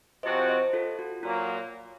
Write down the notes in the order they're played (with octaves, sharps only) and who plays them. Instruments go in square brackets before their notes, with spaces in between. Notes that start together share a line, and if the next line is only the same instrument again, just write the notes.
[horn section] C3 F3 C4 F#4 [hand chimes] C5 D#5
[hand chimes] C5 D#5
F4 A4
F#4
[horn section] A#2 F#3 A#3 [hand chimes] F4